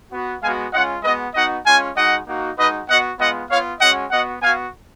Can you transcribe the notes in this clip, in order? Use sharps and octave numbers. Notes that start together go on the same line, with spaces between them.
B3 F#4
G#3 B3 F#4 F5 G#5
G#3 C#4 F4 D#5 F#5
G#3 B3 F#4 B4 D#5
B3 D#4 F#4 D#5 F#5
G#3 C#4 F4 F5 G#5
G#3 D#4 F#4 D#5 F#5
A#3 D#4 F#4
G#3 D#4 F#4 B4 D#5
B3 F#4 D#5 F#5
G#3 B3 F4 D#5 F#5
B3 F4 C#5 F5
G#3 C#4 F#4 D#5 F#5
B3 F#4 D#5 F#5
B3 F#4 F5 G#5